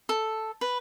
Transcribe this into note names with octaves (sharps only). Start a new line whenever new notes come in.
A4
B4